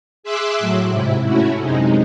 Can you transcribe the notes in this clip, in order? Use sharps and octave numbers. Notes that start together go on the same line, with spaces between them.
G#4 E5 C6 D6 E6 F#6
A2 F#3
G#2 C3 E4
A3 C#4 E4 F#4
F#2 C3 G#3 D#4